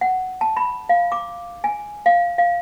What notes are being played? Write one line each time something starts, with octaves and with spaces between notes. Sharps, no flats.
F#5
A5
B5
F5
D6
G#5
F5
F5